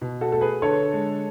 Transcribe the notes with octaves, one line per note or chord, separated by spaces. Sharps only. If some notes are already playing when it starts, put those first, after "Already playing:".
B2
F#4 A4
A3 A4
G#4 B4
D3 A4 C#5
G#3